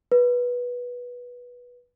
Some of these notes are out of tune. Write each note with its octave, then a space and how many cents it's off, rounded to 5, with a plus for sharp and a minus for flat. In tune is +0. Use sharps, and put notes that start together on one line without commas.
B4 -15